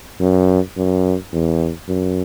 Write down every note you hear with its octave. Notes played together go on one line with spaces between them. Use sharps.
F#2
F#2
E2
F#2